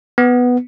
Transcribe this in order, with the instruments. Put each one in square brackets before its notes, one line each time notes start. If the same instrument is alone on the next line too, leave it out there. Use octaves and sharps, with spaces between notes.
[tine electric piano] B3